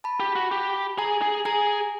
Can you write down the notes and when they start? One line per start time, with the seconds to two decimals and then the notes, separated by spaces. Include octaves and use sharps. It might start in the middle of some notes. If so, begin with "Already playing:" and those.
0.04 A5 B5
0.20 G4
0.36 F#4
0.51 G4
0.98 G#4 G#5 A#5
1.22 G#4
1.45 G#4 G#5 A#5